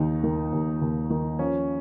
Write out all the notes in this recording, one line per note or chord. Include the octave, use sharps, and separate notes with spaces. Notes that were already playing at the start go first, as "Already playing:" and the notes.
Already playing: D#2 D#3 D#4
D#3
D#2
D#2
D#3
F3 C#4